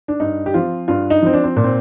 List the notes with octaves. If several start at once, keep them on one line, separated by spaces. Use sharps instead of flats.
D4
G2 D#4
G4
F3 C4 F4
G2 F4
D#4
F3 C4
D4
C4
A#2
C4